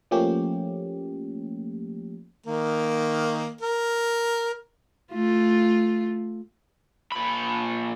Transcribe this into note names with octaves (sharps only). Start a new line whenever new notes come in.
F3 A3 A#3 C#4 G4
D#3 A#3
A#4
A3 F4
A#2 B5